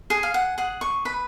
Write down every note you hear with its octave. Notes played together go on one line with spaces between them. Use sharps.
G#4
F5
F#5
G#4 F#5
C#6
B4 B5